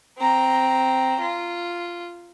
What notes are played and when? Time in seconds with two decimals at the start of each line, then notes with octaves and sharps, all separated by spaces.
0.18 C4 A#5
1.21 F4